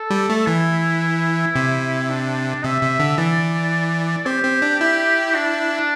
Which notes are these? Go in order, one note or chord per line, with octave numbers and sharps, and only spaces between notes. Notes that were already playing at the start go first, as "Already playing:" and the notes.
Already playing: A4
G3
A3
E3 E4
C3
D4
C3 E5
C3
D3
E3 D5
C4 G4
C4
D4
E4
D4